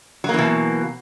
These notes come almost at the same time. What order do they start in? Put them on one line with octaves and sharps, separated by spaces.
F#3 A#3 E3 B2